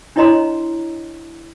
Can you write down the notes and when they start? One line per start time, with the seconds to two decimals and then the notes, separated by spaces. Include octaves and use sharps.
0.16 D4 E4 C#5 D#5 A#5 C6